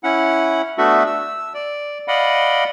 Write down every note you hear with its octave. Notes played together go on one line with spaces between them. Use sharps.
C#4 E4 F#5
A3 B3 D4 F#4 A4 E5
E6
D5
D5 D#5 F5 F#5 B5